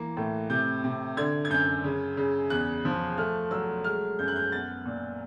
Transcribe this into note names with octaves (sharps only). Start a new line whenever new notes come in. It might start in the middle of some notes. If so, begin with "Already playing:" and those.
Already playing: E3 A#3
A2
C3 G6
C3
D3 G#6
G#6
F#2 G6
C#3
C#3
E2 F#6
F3
A3 F6
F#3 E6
G#3 F6
F#2 G6
F#6
G6
B3 A6
A#2